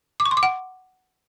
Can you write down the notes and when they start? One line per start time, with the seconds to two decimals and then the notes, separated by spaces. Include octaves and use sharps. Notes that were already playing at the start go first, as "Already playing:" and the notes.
0.20 D6
0.25 C#6
0.31 C6
0.37 D6
0.43 F#5